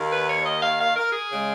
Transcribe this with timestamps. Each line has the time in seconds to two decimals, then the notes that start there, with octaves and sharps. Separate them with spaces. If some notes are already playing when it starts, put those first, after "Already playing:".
Already playing: D#2 D#3 A#3
0.11 B4
0.28 C#5
0.45 D#5
0.62 F5
0.79 F5
0.95 A#4
1.13 G#4
1.30 C#3 G#3